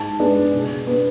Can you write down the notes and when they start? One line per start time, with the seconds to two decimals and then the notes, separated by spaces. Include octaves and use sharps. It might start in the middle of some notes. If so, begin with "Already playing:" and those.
Already playing: G#2 A5
0.20 G#3 B3 D4
0.53 B2
0.87 B3 D4